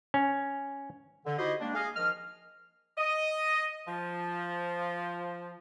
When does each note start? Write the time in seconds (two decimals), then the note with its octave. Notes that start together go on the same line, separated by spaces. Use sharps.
0.14 C#4
1.26 D3
1.38 D#4 E4 F#4 G4 C5 D#5
1.61 G3 G#3 A#3 D4
1.75 G#4 D#5 F5
1.96 D#3 F3 D#5 F6
2.98 D#5
3.87 F3